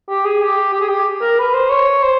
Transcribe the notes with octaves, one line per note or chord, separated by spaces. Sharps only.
G4
G#4
G4
G4
G#4
G4
A#4
B4
C5
C#5
C5